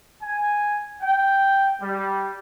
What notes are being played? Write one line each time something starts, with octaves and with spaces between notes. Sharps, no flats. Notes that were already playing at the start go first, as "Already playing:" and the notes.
G#5
G5
G3